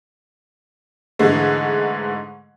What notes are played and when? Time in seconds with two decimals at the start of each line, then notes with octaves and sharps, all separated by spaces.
1.19 G#2 D3 E3 G#3 A3